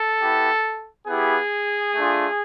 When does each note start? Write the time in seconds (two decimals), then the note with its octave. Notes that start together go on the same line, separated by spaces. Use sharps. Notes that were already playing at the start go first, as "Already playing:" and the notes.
Already playing: A4
0.19 B3 E4 G4
1.07 B3 E4 G4 G#4
1.95 A3 D4 F4